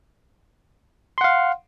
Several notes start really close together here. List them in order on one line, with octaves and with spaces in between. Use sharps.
C6 F#5 F5